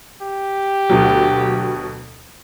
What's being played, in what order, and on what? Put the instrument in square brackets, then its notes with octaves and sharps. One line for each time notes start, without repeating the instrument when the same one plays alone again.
[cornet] G4
[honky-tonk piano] D2 B2 F#3